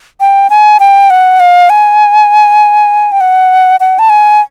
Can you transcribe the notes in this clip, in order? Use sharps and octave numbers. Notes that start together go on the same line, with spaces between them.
G5
G#5
G5
F#5
F5
G#5
G5
F#5
F#5
A5
G#5